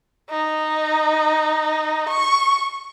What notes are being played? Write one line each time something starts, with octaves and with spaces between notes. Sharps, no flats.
D#4
C#6